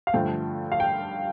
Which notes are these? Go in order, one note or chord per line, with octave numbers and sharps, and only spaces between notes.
F5
G2 D3 F3 A3 G5
F5
G5